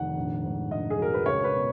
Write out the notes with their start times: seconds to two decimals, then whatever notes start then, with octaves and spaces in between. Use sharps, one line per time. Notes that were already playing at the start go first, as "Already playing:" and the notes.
Already playing: F1 D#3 F#5
0.17 A#1
0.44 G#2
0.71 A#1 D#5
0.90 G#4
0.99 F#3 A#4
1.14 B4
1.26 C#2 C#5
1.44 B4
1.53 B2